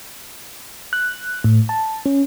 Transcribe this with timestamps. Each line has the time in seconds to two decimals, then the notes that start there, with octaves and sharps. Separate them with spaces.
0.93 F#6
1.44 A2
1.69 A5
2.06 C#4